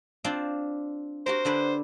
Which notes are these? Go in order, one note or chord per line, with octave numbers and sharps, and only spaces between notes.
C4 D4 F4
F#4 G4 A#4 C5
D3 D4 B4